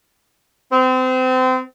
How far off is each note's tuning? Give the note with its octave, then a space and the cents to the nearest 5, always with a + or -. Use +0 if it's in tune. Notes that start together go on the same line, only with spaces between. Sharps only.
C4 -30